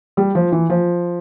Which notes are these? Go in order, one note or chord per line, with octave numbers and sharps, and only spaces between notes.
G3
F3
E3
F3